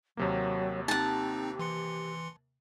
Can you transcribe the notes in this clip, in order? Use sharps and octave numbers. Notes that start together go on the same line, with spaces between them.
D#2 C3 F#3 A#3
C4 D#4 G4 F#5 A5
E3 C6 C#7